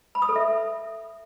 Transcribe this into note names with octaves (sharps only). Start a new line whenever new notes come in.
B5
D#6
A4
E5